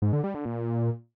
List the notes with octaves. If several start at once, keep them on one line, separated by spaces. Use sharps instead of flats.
G#2
D3
G3
D3
A#2